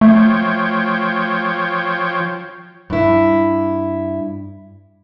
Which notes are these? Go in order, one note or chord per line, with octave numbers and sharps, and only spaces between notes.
F3 A3 C#5 G5
G2 E4